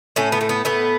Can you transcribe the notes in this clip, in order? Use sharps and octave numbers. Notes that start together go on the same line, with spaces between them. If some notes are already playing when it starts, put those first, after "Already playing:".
A2 C#4
B3
A3
B3
A2 B3